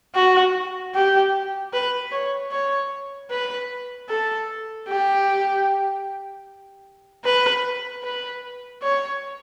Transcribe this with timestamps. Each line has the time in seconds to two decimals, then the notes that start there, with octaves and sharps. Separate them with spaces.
0.15 F#4
0.95 G4
1.73 B4
2.12 C#5
2.52 C#5
3.30 B4
4.10 A4
4.88 G4
7.25 B4
8.04 B4
8.83 C#5